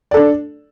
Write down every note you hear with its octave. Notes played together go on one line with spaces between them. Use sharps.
D4 A4 D5